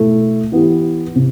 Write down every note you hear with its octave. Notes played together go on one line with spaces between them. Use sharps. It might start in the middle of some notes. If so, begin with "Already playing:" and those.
Already playing: B2 A3 E4 A4
E3 B3 E4 G4
C3